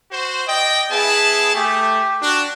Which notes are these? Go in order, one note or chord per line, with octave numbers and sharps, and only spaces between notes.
F#4 C5
D5 D#5 G5
B3 E4 G#4 A5
A3 G4
D4 F#4